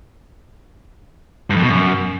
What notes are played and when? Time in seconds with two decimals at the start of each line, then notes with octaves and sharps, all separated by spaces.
1.50 G2
1.56 F2
1.62 B2
1.69 F#2